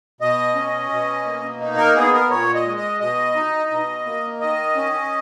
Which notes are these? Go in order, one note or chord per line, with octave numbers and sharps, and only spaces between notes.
B2 D#5
C#4
B2
A#3
D#4
A#4
B3 G#4
A#4
A#2 C#5
D#5
G#3
D#5
B2 D#5
D#4
B2
A#3
D#3 D#5
C#4